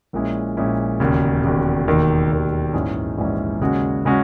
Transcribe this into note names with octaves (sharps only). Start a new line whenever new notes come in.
A#1 A#2 G#3 C#4 E4
A#1 A#2 G#3 C#4 E4
E1 D#2 C#3
E1 D#2 C#3
E1 D#2 D#3
E1 D#2 D#3
A#1 G#2 E3 G#3 C#4
A#1 G#2 E3 G#3 C#4
D#2 C#3 G#3 C#4 F#4
C#3 G#3 C#4 F#4